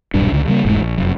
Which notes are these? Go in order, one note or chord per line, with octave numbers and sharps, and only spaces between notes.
D#1 B1 G2 D4
C#2 D3
C#3 G3 G#3 A#3
E1 G#2 G#3 A3
A#1
F1 F#2